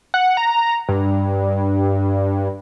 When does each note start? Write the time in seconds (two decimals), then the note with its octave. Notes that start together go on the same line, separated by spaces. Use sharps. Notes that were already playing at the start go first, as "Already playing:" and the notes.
0.14 F#5
0.37 A#5
0.88 G2